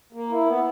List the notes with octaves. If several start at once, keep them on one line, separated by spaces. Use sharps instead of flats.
A#3
E4
B3